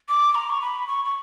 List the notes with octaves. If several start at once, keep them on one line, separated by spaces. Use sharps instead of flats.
D6
A#5
C#6
B5
C#6
C#6